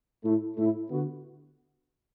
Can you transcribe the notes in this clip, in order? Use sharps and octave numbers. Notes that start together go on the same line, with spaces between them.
A2 A3 E4
A2 A3 E4
D3 B3 F#4